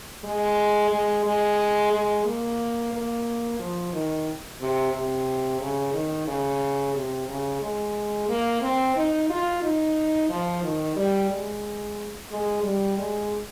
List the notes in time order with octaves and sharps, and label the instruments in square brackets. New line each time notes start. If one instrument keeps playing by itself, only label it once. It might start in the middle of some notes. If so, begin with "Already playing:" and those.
[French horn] G#3
G#3
G#3
G#3
A#3
A#3
F3
D#3
C3
C3
C#3
D#3
C#3
C3
C#3
G#3
A#3
C4
D#4
F4
D#4
F3
D#3
G3
G#3
G#3
G3
G#3